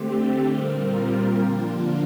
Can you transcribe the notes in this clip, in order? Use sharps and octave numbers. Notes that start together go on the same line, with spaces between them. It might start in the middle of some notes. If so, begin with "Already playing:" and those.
Already playing: D3 A3 C4 G4
A#2 G3 C4 F4 A#4
D3 F3 A#3 D4 F4